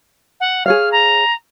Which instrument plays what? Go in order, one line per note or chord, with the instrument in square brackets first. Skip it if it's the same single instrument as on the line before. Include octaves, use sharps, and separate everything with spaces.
[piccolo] F#5
[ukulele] G#4 C#5 F5 [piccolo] F6
[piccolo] A#5